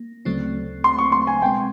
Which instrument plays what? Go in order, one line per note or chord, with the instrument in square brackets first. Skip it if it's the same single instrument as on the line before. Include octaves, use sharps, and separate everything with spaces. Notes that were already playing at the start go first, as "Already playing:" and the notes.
Already playing: [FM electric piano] A#3
D2 C#3 F#3 A3 C4
[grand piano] C6
C#6
C6
G#5
[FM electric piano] B1 B2 G#3 C4 [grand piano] G5